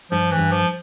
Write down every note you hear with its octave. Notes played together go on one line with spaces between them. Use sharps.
G2 F3
E3
G2
F3